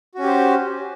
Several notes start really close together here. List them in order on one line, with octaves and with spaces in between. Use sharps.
F#4 C#4 G4 C5